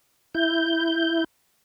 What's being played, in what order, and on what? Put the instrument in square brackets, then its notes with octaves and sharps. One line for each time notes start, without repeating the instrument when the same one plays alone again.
[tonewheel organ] E4 G6